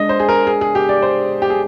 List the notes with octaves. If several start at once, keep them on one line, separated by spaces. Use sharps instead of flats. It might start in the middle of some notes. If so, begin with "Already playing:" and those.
Already playing: G#3 D4 D#5
C5
G#4
A#4
G#4
G#4
G4
D5
C5
G4
G#4